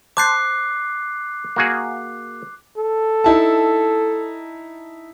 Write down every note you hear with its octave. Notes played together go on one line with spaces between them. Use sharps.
C5 A5 D6 F#6 C7
A#3 F#4 G#4
A4
D#4 E4 A5